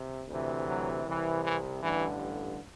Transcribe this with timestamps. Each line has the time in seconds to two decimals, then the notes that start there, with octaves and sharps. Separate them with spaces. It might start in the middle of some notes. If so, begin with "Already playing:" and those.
Already playing: C3
0.28 D2 C3 E3
0.66 F#3
1.05 C2 C3 E3
1.44 E3
1.83 A1 G2 D3 E3